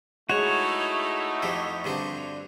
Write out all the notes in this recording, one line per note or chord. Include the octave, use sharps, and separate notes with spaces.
G#3 A3 D#4 E4 F#4 C#5
F2 F3 G4
G2 D3 C4